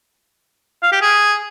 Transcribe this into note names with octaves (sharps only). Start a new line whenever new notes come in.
F5
G4
G#4